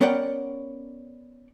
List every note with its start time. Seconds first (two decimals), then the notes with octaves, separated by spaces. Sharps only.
0.01 B3 C#4 A#4 D5 F#5 G5